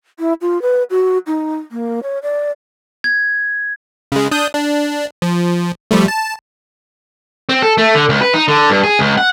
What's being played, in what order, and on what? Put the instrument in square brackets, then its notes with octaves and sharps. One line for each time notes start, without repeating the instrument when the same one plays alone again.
[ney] E4
F4
B4
F#4
D#4
A#3
C#5
D5
[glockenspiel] G#6
[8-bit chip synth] C#3 G#3
D4 D#6 G6
D4
F3
F3 G3 A3
A5
[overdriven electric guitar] C4
A4
A3
D3
C#2
B4
D#4
D3
G2
G#4
C#2
F#5